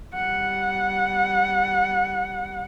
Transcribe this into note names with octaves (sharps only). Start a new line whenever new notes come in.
G3 F#5